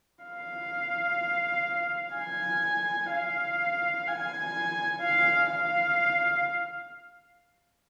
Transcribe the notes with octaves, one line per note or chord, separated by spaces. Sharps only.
F5
G#5
F5
G#5
F5
F5